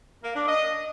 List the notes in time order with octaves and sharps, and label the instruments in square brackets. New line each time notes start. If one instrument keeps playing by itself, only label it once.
[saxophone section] A#3
D4
D#5